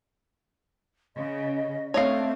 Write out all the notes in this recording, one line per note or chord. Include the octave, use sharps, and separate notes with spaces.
C#3 D#5
A3 C4 D4 C#5 D#5 F5